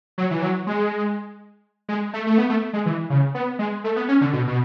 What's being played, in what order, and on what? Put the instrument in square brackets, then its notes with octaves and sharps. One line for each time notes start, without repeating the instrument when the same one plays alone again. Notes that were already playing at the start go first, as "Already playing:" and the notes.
[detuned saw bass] F#3
E3
F#3
G#3
G#3
A3
A3
B3
A3
G#3
E3
C#3
B3
G#3
A3
B3
C#4
D3
B2
B2